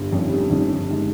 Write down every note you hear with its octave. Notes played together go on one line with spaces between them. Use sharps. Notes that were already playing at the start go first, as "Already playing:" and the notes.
Already playing: G1
F2 D#3 G3 C#4
G1
F2 D#3 G3 C#4
G1
D#3 G#3